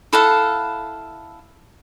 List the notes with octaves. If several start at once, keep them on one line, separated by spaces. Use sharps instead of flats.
E4 A4 F5 F#5